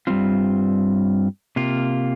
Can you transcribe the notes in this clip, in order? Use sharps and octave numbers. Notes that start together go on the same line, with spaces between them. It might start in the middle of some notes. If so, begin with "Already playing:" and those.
G2 G3 C4 F4
C3 A#3 F4